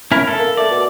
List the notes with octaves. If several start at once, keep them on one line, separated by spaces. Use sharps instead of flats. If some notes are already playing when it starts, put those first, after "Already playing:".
C#4 E4 A#4
A4
A#3
A3 D5
B2